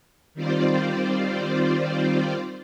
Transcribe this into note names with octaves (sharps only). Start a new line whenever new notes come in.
D#3 G3 C4 F4 C5 D5